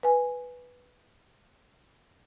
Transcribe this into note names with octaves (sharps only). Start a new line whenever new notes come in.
B4 G#5